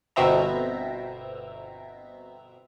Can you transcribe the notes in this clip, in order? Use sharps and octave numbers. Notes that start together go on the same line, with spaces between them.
G1 B2 C4 E5 A#5